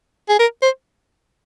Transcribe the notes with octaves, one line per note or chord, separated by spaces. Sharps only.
G#4
A#4
C5